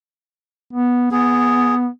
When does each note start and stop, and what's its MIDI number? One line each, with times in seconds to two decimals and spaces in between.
0.73 1.10 59
1.11 1.88 59
1.11 1.75 68